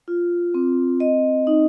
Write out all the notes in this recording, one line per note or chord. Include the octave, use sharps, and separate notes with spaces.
F4
C4
D#5
D#4